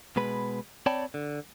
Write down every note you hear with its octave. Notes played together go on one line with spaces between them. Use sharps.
B2 G#3 B4 B5
C4 C#5 D5 G5 A5 B5
D3